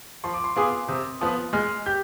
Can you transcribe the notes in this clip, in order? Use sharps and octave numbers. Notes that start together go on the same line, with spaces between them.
F3 C6
D6
C6
B3 F4 G#4 D6
C3 D#6
F3 B3 D#6
G#3 F6
G4 G6